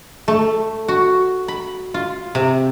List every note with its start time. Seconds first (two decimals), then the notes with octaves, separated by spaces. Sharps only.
0.28 A3
0.88 F#4
1.48 B5
1.94 F4
2.35 C3